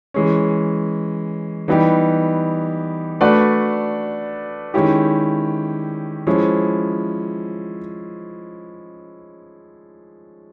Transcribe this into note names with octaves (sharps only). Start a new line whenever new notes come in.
E3 G#3 C#4
E3 G3 B3 D#4 G4
A3 D4 F#4 B4 D5
D#3 G#3 C#4 E4 G4
F3 G#3 C#4 E4